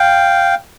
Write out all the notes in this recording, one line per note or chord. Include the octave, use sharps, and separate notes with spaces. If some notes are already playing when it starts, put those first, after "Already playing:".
Already playing: F5 G5